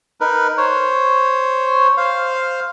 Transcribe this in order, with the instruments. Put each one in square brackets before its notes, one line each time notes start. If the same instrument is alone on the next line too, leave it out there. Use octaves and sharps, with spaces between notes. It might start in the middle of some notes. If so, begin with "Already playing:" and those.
[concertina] D#4 A#4 B4
C5 C#5
C5 F5